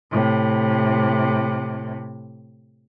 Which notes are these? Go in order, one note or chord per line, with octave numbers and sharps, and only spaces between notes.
A2 C3